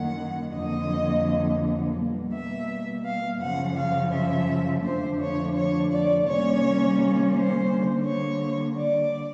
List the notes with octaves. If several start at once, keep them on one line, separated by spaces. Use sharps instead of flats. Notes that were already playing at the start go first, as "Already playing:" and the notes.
Already playing: F#2 D#3 F#3 A#3 F#5
F2 D3 F#3 A#3 D#5
B2 G3 A#3
E5
F5
F#2 C#3 F3 F#5
F5
E5
F2 D3 F3 A3 D4 C5
C#5
C#5
D5
C3 D#3 G3 A#3 C#4 C#5
C5
D3 G3 A#3
C#5
D5